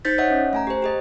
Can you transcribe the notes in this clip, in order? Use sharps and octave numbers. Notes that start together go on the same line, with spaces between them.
D#4 C5 G6 A6 B6
C#5 D#5 E5 F#5
C#4
A3 G#5 A#5
G4 C5
G4 G#4 D#5